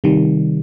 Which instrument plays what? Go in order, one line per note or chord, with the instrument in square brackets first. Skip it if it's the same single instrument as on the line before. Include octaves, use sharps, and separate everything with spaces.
[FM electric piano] C3 D#3 G3